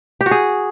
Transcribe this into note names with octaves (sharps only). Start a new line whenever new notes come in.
G4
F#4
G#4